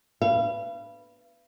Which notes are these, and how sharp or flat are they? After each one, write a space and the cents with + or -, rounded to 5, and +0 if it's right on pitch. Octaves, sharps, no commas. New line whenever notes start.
B4 -5 F5 -40